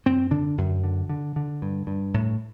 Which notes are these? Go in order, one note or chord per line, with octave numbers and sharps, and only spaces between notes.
F#2 C4
D3 D4
F#2
D3
D3
D3
G2
G2
A2